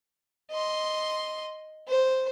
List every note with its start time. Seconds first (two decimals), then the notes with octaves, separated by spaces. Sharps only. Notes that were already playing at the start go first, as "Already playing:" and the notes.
0.51 D#5 C6
1.88 C5